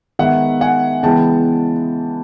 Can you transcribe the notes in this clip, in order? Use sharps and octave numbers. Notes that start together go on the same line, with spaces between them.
D#3 G#3 B3 E5 F#5
F#5 G#5
C#3 E3 G#3 B3 G5 A5